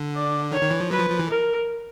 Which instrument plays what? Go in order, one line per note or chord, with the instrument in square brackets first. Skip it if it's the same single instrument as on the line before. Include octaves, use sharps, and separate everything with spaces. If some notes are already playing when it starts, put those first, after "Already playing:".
Already playing: [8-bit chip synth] D3
[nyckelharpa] D5
[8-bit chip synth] D#3 [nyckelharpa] C#5
[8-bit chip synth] D#3
E3
F3
[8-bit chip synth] F#3 [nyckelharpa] B4
[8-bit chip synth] F3
F3
E3
[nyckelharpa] A#4